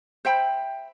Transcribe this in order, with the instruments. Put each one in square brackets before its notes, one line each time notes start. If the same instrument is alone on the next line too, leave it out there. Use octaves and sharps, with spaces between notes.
[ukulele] C5 E5 G5 B5